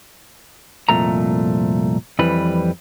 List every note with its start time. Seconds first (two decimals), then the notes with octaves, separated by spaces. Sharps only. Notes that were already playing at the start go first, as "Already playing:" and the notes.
0.89 C2 F2 A#2 A3 A#5
2.19 F2 E3 G3 B4